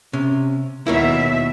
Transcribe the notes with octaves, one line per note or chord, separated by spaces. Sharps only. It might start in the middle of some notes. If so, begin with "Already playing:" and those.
C3 C#4
D#2 B2 E4 A#4 C#5 E5